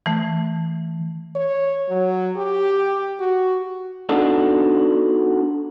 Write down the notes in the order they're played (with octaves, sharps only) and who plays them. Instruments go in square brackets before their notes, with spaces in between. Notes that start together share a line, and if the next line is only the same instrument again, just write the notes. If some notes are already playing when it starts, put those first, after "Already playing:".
[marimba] E3 A3
[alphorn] C#5
F#3
G4
F#4
[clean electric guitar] B3 D4 D#4 F#4 A4 D5